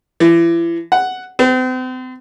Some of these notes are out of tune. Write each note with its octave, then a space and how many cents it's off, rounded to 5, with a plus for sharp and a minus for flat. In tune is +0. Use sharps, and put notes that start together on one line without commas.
E3 +35
F#5 +5
C4 -40